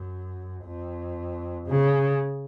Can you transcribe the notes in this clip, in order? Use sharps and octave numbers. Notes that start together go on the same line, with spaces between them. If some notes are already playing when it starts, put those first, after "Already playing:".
Already playing: F#2
F2
C#3